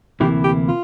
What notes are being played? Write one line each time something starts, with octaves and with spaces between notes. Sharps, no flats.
D2 C3 E3 A#3 E4 G4
G4
F4